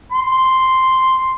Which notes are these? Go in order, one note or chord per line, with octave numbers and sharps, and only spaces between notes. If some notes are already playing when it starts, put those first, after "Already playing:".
C6